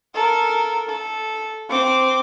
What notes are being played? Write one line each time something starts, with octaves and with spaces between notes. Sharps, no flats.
A4 A#4
A4
C4 D6